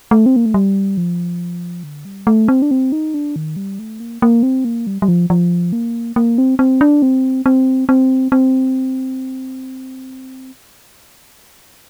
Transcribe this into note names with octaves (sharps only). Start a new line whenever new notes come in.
A3
C4
A#3
A3
G3
F3
D3
G3
A3
C4
D4
C4
D#4
D4
D#3
G3
A3
A#3
A#3
C4
A#3
G3
G3
F3
F3
A#3
A#3
C4
C4
D4
C4
C4
C4
C4